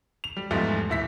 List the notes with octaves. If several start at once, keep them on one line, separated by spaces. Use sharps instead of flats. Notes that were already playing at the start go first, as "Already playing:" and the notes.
F7
G3
E2 G#2 F3 G3 A3
D#1 E4 B6